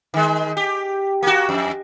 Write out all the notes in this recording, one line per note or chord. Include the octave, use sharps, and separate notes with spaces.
D#3 G#3
G4
A#3 F#4
F2